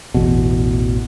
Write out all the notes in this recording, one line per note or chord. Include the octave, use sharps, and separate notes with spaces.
A1 E2 B2